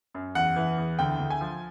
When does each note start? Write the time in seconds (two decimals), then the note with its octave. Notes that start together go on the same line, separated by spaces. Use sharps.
0.14 F#2
0.35 E2 F#5
0.56 E3
0.78 E2
0.99 D2 G5
1.20 D2
1.30 G#5
1.41 F3